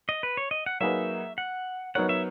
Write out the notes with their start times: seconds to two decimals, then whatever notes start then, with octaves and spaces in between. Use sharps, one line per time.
0.09 D#5
0.23 B4
0.37 C#5
0.51 D#5
0.66 F#5
0.81 F#3 A#3 D#4 G#4 B4 E5
1.38 F#5
1.95 F#3 B3 D#4 A#4 C#5 F#5
2.09 E5